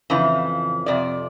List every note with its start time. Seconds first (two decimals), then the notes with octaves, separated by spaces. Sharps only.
0.10 F2 C#3 E3
0.86 F2 C3 D5